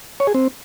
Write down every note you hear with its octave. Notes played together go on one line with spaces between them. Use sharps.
C#5
G#4
C4